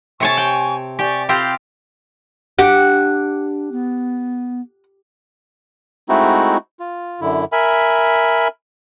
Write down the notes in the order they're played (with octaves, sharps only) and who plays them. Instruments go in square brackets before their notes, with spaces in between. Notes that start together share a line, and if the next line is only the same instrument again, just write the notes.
[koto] C3 C#5 A5 [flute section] G#5 C#6
[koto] G5
[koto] G4 [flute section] D5 G#5 C#6
[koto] C4 F4 G4 [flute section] B5 G6
[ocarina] D4 [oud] G4 [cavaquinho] F#5
[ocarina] B3
[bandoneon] G#3 A3 C4 D#4 E4 F#4
F4
F#2 D3 E4
A#4 E5 G#5 B5